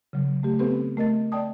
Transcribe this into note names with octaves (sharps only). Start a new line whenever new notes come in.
C#3 F#3
A3 G4
B3 C4 G4 A4 B4 C5
A3 A#4 D#5 A6
D5 D#5 G5 A5 D#6